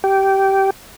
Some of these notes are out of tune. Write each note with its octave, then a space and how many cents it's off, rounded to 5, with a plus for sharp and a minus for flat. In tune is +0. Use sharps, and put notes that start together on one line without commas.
G4 -15